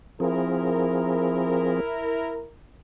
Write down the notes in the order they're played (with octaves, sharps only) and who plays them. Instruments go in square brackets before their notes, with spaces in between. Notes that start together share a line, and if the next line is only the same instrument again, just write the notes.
[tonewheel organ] F3 C4 G#4 [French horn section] E4 A#4